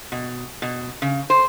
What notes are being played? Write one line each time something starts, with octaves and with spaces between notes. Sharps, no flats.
B2
B2
C#3
C5